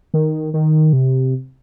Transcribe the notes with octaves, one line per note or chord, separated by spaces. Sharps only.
D#3
D#3
C3